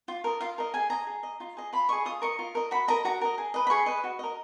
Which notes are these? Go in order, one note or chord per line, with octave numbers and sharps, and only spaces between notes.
F4
A#4 D#5
F4 F5
A#4 D#5
G#4 G#5
D#5 A#5
G#4
D#5
F4
G#4 D#5
F4 B5
G#4 D#5 C#6
F4 D#6
A#4 D#5 C#6
F4
A#4 D#5
F#4 B5
A#4 D#5 A#5
F#4 A#5
A#4 D#5
G#4
B4 D#5
B5
G#4 C#6
B4 D#5
F#4
A#4 D#5